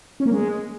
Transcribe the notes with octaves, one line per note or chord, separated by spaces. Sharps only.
C#4
A#3
G#3